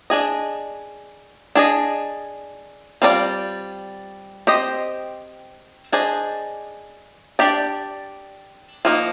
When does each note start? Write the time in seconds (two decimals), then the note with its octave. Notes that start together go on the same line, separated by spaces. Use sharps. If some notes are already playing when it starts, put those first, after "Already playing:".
0.10 D4 G#4 D#5
1.55 D4 G#4 D#5
3.02 G3 C4 F4 A#4 D5
4.47 C4 G4 C5 D#5
5.92 D4 G#4 C5 D#5
7.39 D4 G4 D5
8.85 F3 A#3 D#4